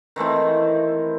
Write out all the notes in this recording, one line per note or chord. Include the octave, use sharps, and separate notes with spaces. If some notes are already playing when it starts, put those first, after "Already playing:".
D#3 E3 A3 C4